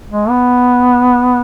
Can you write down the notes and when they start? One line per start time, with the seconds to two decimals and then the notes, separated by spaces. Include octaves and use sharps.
0.10 G#3
0.30 B3